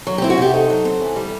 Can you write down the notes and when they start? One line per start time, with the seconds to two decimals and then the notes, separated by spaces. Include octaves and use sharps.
0.07 F#3
0.18 G4
0.22 C4 E4
0.30 F#4
0.38 C3 G4
0.54 D#4 A4
0.70 F#3
0.85 C4
1.00 E3
1.16 G3